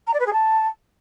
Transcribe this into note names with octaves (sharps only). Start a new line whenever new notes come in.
A#5
D5
B4
G#4
A5